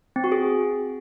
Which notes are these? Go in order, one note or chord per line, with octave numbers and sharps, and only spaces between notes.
C4
F#4
G#4